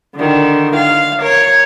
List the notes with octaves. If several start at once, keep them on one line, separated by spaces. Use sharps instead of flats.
D3 D#3
F5
A#4 C#5